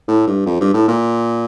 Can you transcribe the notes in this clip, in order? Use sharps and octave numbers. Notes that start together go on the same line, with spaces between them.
A2
G2
F2
G2
A2
A#2